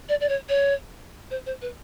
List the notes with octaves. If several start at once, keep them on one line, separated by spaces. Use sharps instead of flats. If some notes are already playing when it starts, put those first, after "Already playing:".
D5
D5
C#5
C#5
C5
C5
B4